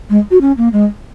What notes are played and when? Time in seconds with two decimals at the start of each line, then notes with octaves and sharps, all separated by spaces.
0.10 G#3
0.31 F#4
0.41 C#4
0.57 A#3
0.73 G#3